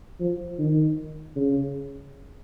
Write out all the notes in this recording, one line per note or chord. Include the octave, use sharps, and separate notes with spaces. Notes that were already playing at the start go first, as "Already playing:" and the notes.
F3
D#3
C#3